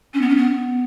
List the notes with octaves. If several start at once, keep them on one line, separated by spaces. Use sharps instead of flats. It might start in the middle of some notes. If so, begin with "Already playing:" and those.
C#4
B3
C#4
B3